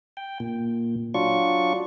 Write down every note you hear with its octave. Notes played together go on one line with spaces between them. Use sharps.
G5
A#2
F#3 D4 F4 C#6